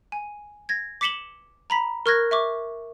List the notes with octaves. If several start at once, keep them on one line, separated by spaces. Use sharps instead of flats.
G#5
G#6 A#6
D6 B6 C#7 E7 F#7 G7
A#5 B5 B6
A#4 C#6 F6 F#6 G#6 A#6
E5 C#6 D6